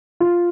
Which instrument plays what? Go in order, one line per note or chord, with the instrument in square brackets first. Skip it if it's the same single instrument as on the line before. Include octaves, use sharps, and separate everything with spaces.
[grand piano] F4